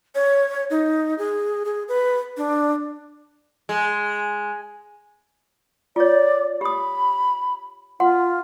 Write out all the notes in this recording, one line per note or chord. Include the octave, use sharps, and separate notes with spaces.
C#5
D#4
G#4
G#4
B4
D4
G#3
F4 C#5 D5
G4 B5 D#6
F4 F#5 C6